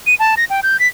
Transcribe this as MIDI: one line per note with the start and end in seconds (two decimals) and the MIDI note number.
0.07 0.15 99
0.20 0.35 81
0.37 0.45 94
0.50 0.61 79
0.63 0.79 91
0.80 0.87 95